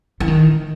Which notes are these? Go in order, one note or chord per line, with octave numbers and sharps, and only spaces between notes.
E3
D#3